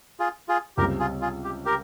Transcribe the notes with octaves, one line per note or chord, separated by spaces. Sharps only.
F4 G#4
F4 G#4
C#2 C3 G3 G4 A#4
F4 G#4
F4 G#4
G4
G4 A#4